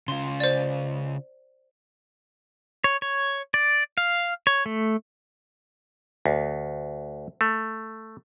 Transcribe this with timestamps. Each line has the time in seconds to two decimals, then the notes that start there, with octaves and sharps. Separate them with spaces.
0.08 C#3 F4 C6
0.40 C5 D5
2.84 C#5
3.02 C#5
3.54 D5
3.98 F5
4.47 C#5
4.66 A3
6.26 D2
7.41 A3